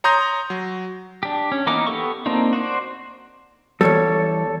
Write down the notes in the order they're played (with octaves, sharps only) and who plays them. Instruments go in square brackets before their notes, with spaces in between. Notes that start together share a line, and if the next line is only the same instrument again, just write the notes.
[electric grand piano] C#5 A#5 C6 D#6 G6 A#6
F#3
[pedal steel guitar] D4 G4
C#4
E3 A#3 B3 D#4 D6
B3 G4 A4 C#6
A#3 C4 D4 D#4 F4
F#4 C5 D5
[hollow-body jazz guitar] E2 G#2 G3 [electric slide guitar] A4 C#5